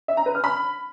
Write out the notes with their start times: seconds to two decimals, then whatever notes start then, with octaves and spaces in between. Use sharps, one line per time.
0.08 E5
0.17 A#5
0.26 B4
0.35 F6
0.44 B5